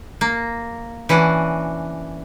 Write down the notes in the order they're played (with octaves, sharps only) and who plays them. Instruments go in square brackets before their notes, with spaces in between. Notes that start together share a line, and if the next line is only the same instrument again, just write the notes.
[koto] A#3
E3 C#4 D4 F#4